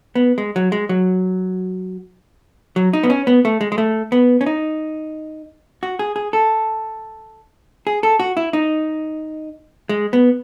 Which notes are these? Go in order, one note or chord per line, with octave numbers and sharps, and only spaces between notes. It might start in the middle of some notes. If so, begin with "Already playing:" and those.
B3
G#3
F#3
G#3
F#3
F#3
D#4
B3
C#4
B3
A3
G#3
G#3
A3
B3
C#4
D#4
F#4
G#4
G#4
A4
G#4
A4
F#4
E4
D#4
G#3
B3